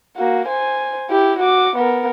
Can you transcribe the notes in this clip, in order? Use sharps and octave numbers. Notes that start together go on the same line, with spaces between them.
A#3 F#4
C5 G#5
E4 G4
F#4 D6
B3 A#4